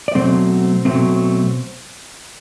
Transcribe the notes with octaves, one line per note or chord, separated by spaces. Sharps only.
D5
B2 F#3 A3 C4 C5
B2 F#3 A3 C4